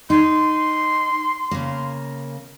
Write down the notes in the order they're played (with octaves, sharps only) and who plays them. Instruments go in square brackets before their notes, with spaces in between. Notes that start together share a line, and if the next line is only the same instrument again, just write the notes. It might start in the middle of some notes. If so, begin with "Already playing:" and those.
[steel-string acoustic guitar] D#4 [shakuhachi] C6
[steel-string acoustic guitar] C#3 A#3